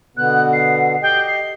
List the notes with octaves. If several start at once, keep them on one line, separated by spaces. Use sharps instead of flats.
B2 D3 B3 F#6
C7
G4 D#5 G5
C7